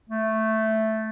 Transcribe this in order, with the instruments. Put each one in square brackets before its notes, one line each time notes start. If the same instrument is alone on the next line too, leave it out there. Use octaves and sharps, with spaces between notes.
[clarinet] A3